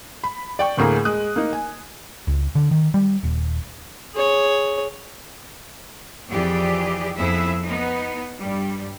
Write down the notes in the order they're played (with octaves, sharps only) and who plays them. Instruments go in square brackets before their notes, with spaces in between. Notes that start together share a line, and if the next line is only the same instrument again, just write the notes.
[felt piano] B5
D5 G5 C#6
D2 A2 A#3 G#4 A#5
G#3 D#6 F#6
A#3 D#4
G#5
[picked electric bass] C#2
D3
D#3
G3
D#1
[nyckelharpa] G#4 C#5
[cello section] F2 E3 G4 G#4 D5
F2 B3 E4 G#4 E5
B3 D#4
G2 G3